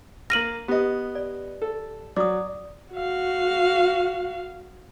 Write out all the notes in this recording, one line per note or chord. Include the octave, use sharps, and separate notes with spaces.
A#3 F6 A#6 D#7 F#7
B3 G4 D#5
D5
A4
F#3 D5 D6 D#6
F#4 F5